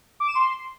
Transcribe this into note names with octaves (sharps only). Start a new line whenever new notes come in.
D6
E7
C6